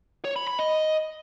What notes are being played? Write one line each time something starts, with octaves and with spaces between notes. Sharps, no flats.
C#5
B5
B5
D#5